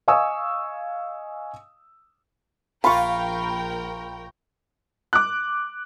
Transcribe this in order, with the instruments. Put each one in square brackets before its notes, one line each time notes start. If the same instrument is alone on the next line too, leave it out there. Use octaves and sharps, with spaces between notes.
[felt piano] D#5 F5 G#5 C#6 D#6 E6
[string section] A#1 A#4 G5 [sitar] F4 [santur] B5 C#6
[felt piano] D6 F#6